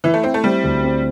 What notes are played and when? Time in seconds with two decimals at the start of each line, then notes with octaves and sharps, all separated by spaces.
0.04 E3 E4
0.14 A3
0.23 C4 E4
0.34 A3
0.44 G3 C4
0.64 D2
0.84 C4